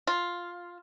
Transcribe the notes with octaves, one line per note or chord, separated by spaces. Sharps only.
F4